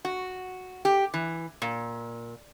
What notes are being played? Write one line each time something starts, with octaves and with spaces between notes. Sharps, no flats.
F#4
G4
E3
A#2